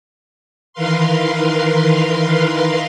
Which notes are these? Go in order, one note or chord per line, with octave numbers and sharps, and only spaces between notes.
D#3 E3 A#4 B4 F5 C6